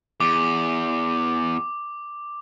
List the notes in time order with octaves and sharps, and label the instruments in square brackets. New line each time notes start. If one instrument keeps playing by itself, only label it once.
[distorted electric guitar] E2 [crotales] D6